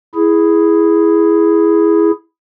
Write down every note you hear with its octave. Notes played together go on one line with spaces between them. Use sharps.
E4 G#4